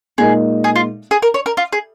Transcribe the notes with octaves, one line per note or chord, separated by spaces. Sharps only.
A#2 G#3 D#4 G#4 A#4 D#5
G#4
F4
G#4
A#4
C#5
A#4
F4
G#4